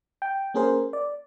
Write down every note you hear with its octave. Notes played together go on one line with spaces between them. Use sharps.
G5
A#3 C#4 G#4 A#4 C5
D5